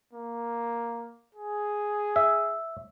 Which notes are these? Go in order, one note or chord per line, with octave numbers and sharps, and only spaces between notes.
A#3
G#4
E5